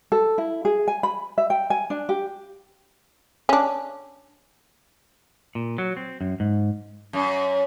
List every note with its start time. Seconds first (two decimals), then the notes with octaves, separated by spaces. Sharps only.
0.12 A4
0.38 E4
0.65 G#4
0.88 G#5
1.03 B5
1.38 E5
1.50 G5
1.70 G#5
1.90 D4
2.09 G4
3.49 C#4 D4
5.55 A#2
5.78 F#3
5.97 C4
6.21 F#2
6.40 G#2
7.13 F#2